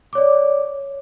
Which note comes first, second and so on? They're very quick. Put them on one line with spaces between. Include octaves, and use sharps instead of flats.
D6 C#5 D5